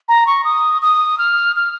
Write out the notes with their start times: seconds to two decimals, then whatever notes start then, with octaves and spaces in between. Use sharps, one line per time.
0.08 A#5
0.27 C#6
0.44 D#6
0.82 D#6
1.18 F6
1.56 F6